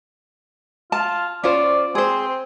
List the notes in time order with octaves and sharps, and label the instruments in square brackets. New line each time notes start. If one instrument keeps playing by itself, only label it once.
[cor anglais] F4 [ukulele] A5
[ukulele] C#4 F4 C5 [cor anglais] D5
[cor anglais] C4 [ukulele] G#4 C5